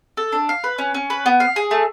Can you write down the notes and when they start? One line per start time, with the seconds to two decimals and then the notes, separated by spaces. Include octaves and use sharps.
0.17 A4
0.32 D4
0.49 F5
0.64 B4
0.78 C#4
0.94 C#4
1.10 B4
1.26 B3
1.40 F5
1.56 G#4
1.71 A3